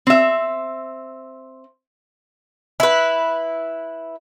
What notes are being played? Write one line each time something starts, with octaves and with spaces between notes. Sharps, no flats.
C4 E5
E4 B4